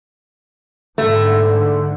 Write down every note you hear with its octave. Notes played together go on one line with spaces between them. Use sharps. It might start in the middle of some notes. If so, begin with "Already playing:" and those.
G#2 D3 A3